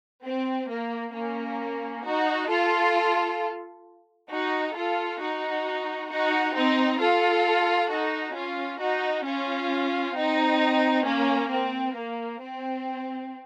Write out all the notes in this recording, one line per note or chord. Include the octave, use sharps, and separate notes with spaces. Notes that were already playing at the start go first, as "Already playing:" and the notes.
C4
A#3
A#3 C#4
D#4 F#4
F4 A4
D#4 F#4
F4 A4
D#4 F#4
D#4 F#4
C4 D#4
F4 A4
D#4 F#4
C#4 F4
D#4 F#4
C#4 F4
C4 D#4
A#3 C#4
C4
A#3
C4